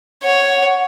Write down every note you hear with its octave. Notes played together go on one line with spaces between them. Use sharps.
C#5 F#5